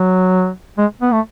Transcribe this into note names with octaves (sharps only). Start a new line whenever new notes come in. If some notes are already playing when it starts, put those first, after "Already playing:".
Already playing: F#3
G#3
B3
A3